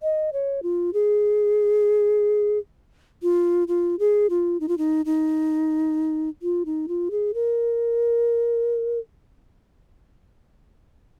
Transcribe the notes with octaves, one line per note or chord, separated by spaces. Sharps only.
D#5
C#5
F4
G#4
F4
F4
G#4
F4
D#4
F4
D#4
D#4
F4
D#4
F4
G#4
A#4